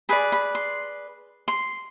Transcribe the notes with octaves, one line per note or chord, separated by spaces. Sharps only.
G#4 B4 D5 B5
B5
C6
C6